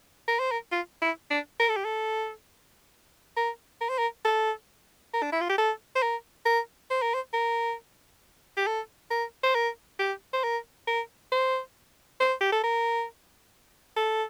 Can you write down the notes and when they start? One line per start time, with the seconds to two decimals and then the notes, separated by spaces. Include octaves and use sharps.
0.28 A#4
0.39 C5
0.52 A#4
0.72 F4
1.02 E4
1.31 D4
1.60 A#4
1.69 A4
1.76 G4
1.85 A4
3.37 A#4
3.81 A#4
3.89 C5
3.98 A#4
4.25 A4
5.14 A#4
5.23 D4
5.32 E4
5.41 F4
5.50 G4
5.58 A4
5.96 C5
6.03 A#4
6.46 A#4
6.90 C5
7.02 A#4
7.14 C5
7.34 A#4
8.57 G4
8.67 A4
9.11 A#4
9.43 C5
9.55 A#4
9.99 G4
10.33 C5
10.44 A#4
10.87 A#4
11.32 C5
12.20 C5
12.41 G4
12.52 A4
12.64 A#4
13.97 A4